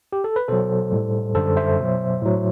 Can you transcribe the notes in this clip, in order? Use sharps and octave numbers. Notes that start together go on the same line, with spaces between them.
G4
A4
B4
B2 F#3 A4 C5
A2 G3
F#2 D3 G3 A4 C5
C5 E5
B2 F#3
A2 F#3